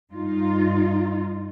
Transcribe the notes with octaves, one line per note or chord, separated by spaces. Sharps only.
G2 D#4 F4